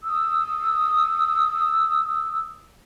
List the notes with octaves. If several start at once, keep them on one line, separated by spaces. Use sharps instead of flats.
D#6 E6